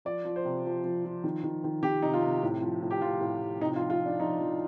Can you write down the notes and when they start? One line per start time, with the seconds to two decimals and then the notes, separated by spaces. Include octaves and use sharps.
0.05 F3 D5
0.25 F3
0.36 C5
0.45 C3
0.65 F3
0.84 F3
1.05 F3
1.24 D#3
1.44 D#3
1.64 D#3
1.83 D#3 G4
2.02 C3 D#4
2.13 F4
2.22 C3
2.43 A2
2.62 F3
2.82 A2
2.91 G4
3.01 F3 F4
3.21 A2
3.42 F3
3.60 C3 D#4
3.76 F4
3.81 F3
3.90 F4
4.01 F3 D4
4.20 F3 D#4
4.40 F3